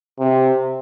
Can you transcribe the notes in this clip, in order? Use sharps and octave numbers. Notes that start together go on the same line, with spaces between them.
C3